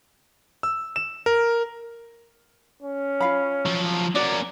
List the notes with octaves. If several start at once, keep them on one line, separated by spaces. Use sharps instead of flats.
E6
E7
A#4
C#4
F4 F5 B5
F3 F#3
A#3 C#4 F#4 D5